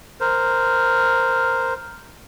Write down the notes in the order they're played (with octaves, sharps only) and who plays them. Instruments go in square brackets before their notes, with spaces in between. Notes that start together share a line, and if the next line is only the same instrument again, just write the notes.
[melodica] A#4 C5